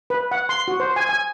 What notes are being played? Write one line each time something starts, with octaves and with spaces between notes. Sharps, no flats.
B4
F#5
C6
F#4
C5
G#5
G#5